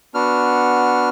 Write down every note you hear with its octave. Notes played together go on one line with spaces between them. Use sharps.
B3 D4 F#4 F6